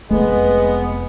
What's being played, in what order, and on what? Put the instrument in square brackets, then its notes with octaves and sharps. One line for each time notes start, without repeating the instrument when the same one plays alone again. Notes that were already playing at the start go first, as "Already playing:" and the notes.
[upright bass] F1 F2 [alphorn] G#3 [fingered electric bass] A3 [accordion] B3